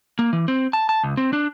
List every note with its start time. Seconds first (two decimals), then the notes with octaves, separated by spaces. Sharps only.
0.19 A#3
0.33 E3
0.48 C4
0.73 A5
0.89 A5
1.03 C#2
1.17 C4
1.33 D4